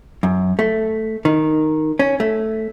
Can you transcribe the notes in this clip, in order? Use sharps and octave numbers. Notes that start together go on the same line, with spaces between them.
F#2
A3
D#3
C#4
A3